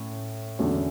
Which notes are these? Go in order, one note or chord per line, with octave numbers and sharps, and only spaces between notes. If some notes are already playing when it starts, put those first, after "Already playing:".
Already playing: A2 C#4
E2 D3 A3 C#4 F#4